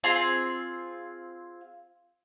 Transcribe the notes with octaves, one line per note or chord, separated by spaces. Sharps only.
C4 F4 G#4